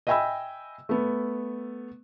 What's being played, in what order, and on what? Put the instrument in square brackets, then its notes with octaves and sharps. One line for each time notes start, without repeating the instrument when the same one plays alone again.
[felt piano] D#5 E5 G5 G#5 B5 E6
A3 B3